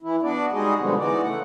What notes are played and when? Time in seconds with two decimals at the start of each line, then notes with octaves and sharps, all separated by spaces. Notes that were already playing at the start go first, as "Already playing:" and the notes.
0.03 E3 E4
0.23 B3 D4 F#4 D5
0.52 G3 G#3 D#4 F#4 G#4 D#5
0.79 B2 D3 F3 G3 G#3 B3
0.98 E3 G#3 B3 D#4 F#4 D5
1.22 C#3 A3 F#5